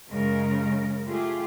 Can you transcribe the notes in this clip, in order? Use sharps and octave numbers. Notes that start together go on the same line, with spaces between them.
F#2 C#3 G#3 A#4
A3 F4 G4 G#4